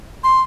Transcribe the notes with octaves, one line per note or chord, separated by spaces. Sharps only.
C6